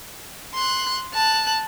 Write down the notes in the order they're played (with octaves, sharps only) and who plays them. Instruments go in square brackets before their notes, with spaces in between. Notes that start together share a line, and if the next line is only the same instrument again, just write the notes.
[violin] C6 F#6
A5 F#6